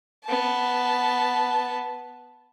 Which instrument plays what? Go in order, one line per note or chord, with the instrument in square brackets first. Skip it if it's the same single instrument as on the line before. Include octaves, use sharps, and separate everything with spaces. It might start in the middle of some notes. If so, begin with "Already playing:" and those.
[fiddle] B3 A5